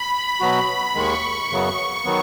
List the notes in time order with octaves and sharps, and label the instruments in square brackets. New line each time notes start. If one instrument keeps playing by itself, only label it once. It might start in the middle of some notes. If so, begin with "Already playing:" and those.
Already playing: [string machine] B5
[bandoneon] B2 F#3 B3 F#4 [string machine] B5
[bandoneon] D#2 D#3 G#3 [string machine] C#6
[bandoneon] F#2 C#3 F#3 B3
D#3 F#3 B3